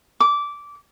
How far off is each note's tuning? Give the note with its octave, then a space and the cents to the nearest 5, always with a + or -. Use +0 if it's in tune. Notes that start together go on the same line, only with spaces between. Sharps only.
D6 -15